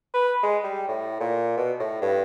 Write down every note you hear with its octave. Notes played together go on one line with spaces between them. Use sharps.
B4
G#3
G3
A2
A#2
B2
A2
G2